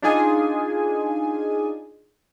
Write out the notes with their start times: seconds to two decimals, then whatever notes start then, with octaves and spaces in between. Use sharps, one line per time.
0.02 D4 D#4 F4 G#4 G#5